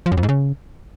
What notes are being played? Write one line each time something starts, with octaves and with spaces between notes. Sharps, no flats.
F3
F#2
F2
G#2
C#3